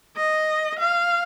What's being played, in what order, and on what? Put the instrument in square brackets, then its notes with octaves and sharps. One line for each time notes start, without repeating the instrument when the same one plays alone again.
[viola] D#5
F5